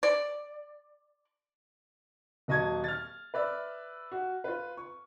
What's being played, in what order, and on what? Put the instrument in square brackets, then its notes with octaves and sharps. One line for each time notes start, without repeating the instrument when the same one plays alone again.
[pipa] D5
[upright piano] D#1 F#3 D#5 A5 C#6 G#6
F6 A6
B4 D5 E5
F#4
F4 B4
C#6